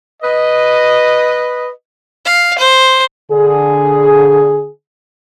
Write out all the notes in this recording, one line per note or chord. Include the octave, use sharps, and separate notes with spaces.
B4 D#5
F5
C5
D3 G#4